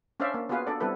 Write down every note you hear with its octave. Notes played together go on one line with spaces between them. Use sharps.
C#4 D4 C5 D5 E5 F5
A#3
B3 F4 F#4 G#4 B4 F5
D4 A4 D5
G3 B3 C4 E4 A4 B4